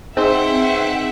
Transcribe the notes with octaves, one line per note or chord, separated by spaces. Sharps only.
C4 D#4 G#4 B4 E5 F#5 G5 C6